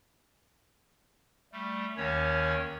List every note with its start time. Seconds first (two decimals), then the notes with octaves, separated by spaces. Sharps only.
1.52 G3 A3
1.97 D#2 D#3 C#4 C#5